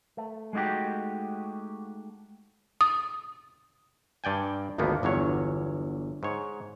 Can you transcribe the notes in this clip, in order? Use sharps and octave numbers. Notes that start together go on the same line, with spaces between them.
A3
G#3 A3 D#4 F#4 G4
D#6
G2 D5 G5 G#5
G#1 D2 F3 A#3 B3
G1 E2 F#3 C#5
G#2 C#5